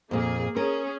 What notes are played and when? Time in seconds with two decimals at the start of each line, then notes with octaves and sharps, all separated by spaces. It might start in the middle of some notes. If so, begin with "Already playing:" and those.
0.11 F2 A#2 A#3 G#4
0.56 C#4 G#4 A#4